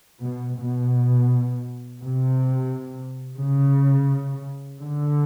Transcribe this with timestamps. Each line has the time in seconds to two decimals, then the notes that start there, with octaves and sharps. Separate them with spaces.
0.24 B2
0.60 B2
1.99 C3
3.40 C#3
4.80 D3